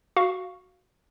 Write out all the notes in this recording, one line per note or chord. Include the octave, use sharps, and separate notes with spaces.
F#4 F5 C#6